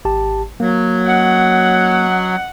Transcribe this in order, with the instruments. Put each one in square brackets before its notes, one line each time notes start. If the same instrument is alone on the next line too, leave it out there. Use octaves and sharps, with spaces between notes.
[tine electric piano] G#1 G4 A5
[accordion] F#3 [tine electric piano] A#3
[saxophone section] C#4 D#5 F#5